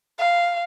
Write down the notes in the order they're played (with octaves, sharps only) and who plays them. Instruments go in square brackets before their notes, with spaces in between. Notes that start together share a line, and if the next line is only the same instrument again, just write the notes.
[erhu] F5